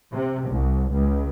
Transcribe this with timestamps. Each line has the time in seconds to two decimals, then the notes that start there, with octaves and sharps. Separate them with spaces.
0.12 C3
0.49 C2
0.92 C#2